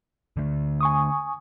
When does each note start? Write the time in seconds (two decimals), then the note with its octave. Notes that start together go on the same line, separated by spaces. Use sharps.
0.37 D3 A3
0.81 G#5 C#6 D#6